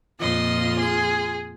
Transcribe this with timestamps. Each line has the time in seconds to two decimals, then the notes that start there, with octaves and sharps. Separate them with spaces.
0.20 F2 A#2 F4 D#5 C6
0.79 G#4